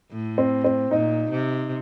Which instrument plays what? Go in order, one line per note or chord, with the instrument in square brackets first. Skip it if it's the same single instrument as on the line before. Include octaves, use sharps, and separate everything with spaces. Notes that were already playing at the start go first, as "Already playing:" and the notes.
[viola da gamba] A2
[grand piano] C4
C4
[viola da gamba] A#2 [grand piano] D#4
[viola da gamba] C3